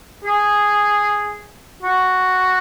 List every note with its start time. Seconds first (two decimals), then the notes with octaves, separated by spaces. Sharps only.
0.25 G#4
1.83 F#4